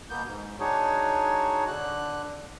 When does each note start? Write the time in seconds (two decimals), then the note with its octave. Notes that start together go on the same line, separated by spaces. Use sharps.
0.10 B2 A#3 B3 G6
0.25 G#2
0.60 D4 D#4 F#4 G#4 C#5
1.68 D3 F#6